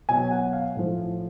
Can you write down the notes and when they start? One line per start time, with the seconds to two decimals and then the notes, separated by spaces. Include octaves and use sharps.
0.09 B2 F#3 G#5
0.31 F#5
0.53 F5
0.76 A2 F3